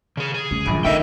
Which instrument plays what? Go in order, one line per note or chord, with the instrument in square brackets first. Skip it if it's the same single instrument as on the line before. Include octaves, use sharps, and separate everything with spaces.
[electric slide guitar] C#3 G#4
G#4
[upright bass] C#2
[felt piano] A#1 B5 D7 [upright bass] D#3 F#3
[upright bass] D3 [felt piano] D#3 [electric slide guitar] A4 D#5 G5 [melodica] E5